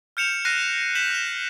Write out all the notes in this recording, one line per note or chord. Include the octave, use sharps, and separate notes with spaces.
F6 G6 C#7 E7 F7
F6 F#6 A#6 C7 D#7
G6 B6 D#7 E7 F#7
F6 E7